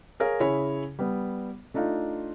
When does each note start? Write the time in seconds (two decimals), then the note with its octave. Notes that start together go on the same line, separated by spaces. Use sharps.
0.20 G#4 A#4 C#5 F5
0.40 C#3 E4 G#4 C#5 B5
0.99 G3 B3
1.74 A3 D4 D#4 F4 F5